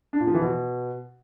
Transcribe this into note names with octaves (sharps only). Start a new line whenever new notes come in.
D4
A#2
F3
E3
B2